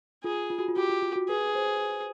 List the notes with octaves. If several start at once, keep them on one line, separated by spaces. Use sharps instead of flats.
F4 G#4
F4
F#4
F4
F#4 G4
F4
F4
F#4
G#4 B4
C5